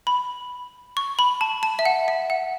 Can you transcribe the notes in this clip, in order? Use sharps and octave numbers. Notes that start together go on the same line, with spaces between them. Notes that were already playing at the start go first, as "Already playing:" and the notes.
B5
C#6
B5
A5
A5
E5
F#5
E5
F#5